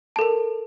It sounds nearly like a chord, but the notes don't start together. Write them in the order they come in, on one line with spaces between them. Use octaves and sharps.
A5 A4 A#4